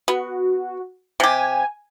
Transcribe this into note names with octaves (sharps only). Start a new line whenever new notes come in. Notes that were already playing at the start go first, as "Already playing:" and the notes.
B3 F#4
C3 G4 G#5